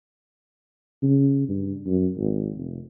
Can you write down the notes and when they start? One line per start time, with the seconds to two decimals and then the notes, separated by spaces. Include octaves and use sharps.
1.02 C#3
1.48 G2
1.86 F#2
2.17 G#1
2.55 F1